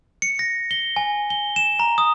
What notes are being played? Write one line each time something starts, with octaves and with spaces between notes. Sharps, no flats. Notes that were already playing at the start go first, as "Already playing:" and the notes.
C#7
A#6
G7
G#5
G7
E7
A#5
D#6